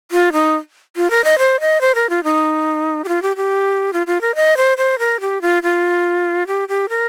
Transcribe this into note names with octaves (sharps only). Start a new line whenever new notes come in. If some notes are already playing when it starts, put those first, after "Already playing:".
F4
D#4
F4
A#4
D#5
C5
D#5
C5
A#4
F4
D#4
G4
F4
G4
G4
F4
F4
A#4
D#5
C5
C5
A#4
G4
F4
F4
G4
G4
A#4